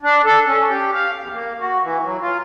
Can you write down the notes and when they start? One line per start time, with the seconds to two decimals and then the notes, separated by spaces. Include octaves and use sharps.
0.02 D4
0.25 A4
0.47 C#4
0.69 G4
0.94 F5
1.21 E2
1.33 A#3
1.61 F#4
1.83 E3
2.04 F#3
2.22 F4